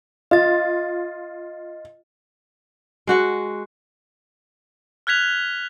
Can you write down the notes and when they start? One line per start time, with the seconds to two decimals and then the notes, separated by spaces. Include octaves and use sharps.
0.31 F4 D#5 A6
3.07 G#3 F#4 F#5
5.07 F6 F#6 G#6 B6 F7